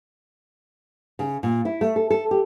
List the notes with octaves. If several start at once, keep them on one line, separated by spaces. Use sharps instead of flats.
C#3
A#2
E4
A3
A4
A4
G4